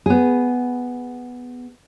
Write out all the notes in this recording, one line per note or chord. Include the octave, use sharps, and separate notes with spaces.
B3 G#4